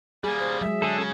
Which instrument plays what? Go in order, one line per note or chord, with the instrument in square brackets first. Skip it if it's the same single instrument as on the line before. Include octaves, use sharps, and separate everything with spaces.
[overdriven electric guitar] G3 A#3 [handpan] G#4 [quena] G#5
[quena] C5
[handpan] F#3 G#3 [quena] E5
[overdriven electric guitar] D3 [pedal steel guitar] G#4 A4
[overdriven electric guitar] C#3 C#4